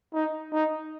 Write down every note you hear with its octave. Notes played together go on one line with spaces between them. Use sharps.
D#4
D#4